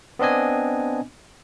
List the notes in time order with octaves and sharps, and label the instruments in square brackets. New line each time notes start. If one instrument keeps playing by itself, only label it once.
[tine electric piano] B3 C4 D4 D#5 G#5